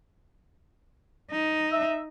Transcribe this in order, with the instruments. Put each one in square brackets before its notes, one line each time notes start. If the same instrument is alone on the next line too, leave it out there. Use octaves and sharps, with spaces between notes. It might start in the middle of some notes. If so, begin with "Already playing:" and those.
[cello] D#4
[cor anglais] E5